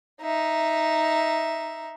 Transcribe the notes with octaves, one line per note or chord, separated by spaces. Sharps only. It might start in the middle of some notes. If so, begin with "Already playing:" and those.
D#4 E5